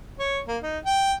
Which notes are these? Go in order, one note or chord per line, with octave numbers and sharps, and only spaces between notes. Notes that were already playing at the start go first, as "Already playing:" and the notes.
C#5
A#3
D#4
G5